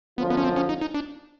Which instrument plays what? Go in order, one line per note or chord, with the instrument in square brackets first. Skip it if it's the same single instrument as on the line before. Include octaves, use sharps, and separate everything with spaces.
[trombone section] F#2 D3 F3 [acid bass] B3
[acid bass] B3
C#4
C4
C#4
D#4
D#4
D4